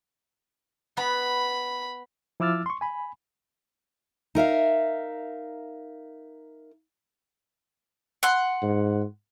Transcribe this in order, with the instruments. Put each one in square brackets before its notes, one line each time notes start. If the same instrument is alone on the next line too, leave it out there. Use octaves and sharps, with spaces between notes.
[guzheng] B3 [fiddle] B5
[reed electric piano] F3 E4 D6 E6 F6 A6
C6 C#6
G#5 B5
[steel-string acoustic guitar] D#4 A#4 E5 F5
[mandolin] F#5 C6
[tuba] G#2